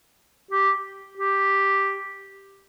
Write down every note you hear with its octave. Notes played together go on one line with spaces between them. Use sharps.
G4
G4